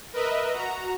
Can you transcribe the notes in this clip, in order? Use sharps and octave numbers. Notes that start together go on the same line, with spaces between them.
A#4 B4 D#5 E5
F#4 A#5